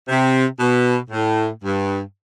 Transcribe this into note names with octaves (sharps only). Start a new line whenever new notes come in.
C3
B2
A2
G2